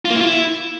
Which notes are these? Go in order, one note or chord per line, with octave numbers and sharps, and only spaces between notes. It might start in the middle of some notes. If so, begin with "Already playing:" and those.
F4
A#3
E4
F4
E4